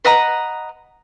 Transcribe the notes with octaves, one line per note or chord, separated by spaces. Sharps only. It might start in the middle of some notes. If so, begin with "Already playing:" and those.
B4 D#5 F#5 A#5